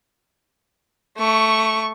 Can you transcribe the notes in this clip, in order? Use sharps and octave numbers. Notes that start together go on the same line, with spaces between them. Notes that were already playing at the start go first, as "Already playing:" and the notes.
A3 C#6